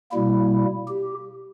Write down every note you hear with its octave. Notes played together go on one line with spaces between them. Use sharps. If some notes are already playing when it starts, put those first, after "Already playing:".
B2 G3 A#3 E4
G4